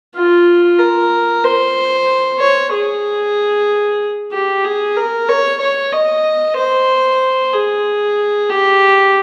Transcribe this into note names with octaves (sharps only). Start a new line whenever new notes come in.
F4
A#4
C5
C#5
G#4
G4
G#4
A#4
C#5
C#5
D#5
C5
G#4
G4